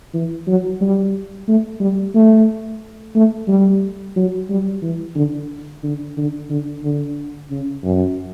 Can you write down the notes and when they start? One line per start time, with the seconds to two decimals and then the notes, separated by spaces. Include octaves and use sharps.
0.14 E3
0.47 F#3
0.81 G3
1.48 A3
1.81 G3
2.15 A3
3.16 A3
3.48 G3
4.16 F#3
4.50 G3
4.82 E3
5.16 D3
5.83 D3
6.17 D3
6.50 D3
6.83 D3
7.51 C#3
7.84 F#2